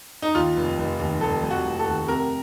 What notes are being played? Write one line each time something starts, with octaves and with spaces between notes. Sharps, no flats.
D#4
D#2 F4
F1
F1
D#2
F1 A4
F1
F#4
F1
A4
D#2
C3 A#4